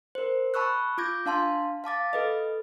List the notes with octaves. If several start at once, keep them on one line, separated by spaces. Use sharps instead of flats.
A#4 C5
A5 B5 C#6 E6 F#6
F4 D6 G6 G#6 A#6
D4 F5 A5 C6
F5 A5 D6 A6
A4 B4 D#5